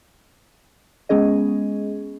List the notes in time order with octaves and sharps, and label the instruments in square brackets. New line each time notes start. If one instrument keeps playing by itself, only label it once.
[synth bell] G#3 B3 C#4 G#4 D#5